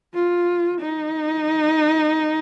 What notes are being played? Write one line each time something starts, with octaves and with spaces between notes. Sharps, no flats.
F4
D#4